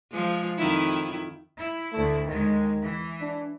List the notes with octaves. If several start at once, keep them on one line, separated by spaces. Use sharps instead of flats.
F3 G#3
F2 D#3 E4
E4
D2 A3 E4
D#2 D#3 G#3
E3
D4